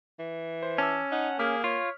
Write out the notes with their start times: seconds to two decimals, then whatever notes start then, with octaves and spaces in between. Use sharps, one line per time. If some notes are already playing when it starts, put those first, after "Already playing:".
0.19 E3
0.63 C5
0.78 C#4 A5 D6 E6
1.12 D#4 F#5
1.39 A#3 G#4 D6 F6 B6
1.64 F4 C#5